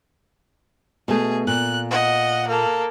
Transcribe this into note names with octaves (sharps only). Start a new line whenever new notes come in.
B2 A3 G#4
A#2 F#6
D#5 F#5
A#3 A4